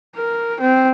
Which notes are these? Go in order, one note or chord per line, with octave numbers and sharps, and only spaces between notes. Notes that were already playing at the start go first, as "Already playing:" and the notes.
A#4
C4